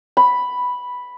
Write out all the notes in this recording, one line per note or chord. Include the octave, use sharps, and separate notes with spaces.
B5